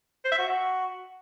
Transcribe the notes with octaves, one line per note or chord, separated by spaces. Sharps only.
C5
E5
F#4